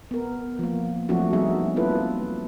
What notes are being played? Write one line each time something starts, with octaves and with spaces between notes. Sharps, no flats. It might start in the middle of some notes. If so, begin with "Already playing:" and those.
B3 A#4
F3 A#3
F3 F#3 A3 C4 D4 F#4
F#3 G3 B3 D#4 G#4 E5
A#3 C4 E4 F4 A4 B4